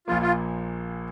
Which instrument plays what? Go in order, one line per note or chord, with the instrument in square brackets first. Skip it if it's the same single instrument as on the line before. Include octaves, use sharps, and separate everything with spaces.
[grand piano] A#1 A#2 F3 A#3 [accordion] F4
[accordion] F4